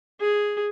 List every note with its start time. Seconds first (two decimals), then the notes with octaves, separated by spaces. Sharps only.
0.20 G#4